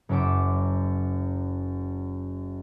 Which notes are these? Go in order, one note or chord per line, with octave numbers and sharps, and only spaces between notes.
F#1 F#2 E5 D6